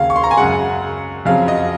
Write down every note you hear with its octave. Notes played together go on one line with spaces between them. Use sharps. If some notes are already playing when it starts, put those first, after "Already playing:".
Already playing: D#2 C#3 F#3 F5
C#6
C6
A#5
G#5
F#2 C#3 G#3 F#5
F2 C#3 F#3 F5
D#5